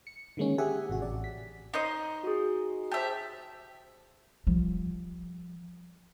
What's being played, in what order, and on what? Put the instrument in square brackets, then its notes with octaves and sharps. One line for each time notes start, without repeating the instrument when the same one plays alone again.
[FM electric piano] C#7
D3 D#3 G#3 A#3 C#4
G4 G#4 E5 F#5 G#5
G#1 C3 F#4
A1 D5
B6
[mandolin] D#4 C5 D#5
[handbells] F#4 G#4
[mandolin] G4 E5 [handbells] C5 A5
[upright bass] F3 G3